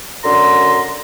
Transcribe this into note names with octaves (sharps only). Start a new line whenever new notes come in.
F#2 D3 A#5 C6